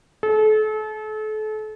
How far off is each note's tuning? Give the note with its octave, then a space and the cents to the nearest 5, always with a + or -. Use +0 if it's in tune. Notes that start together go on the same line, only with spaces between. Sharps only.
A4 -35